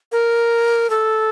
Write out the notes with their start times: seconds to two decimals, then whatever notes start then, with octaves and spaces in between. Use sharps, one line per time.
0.12 A#4
0.90 A4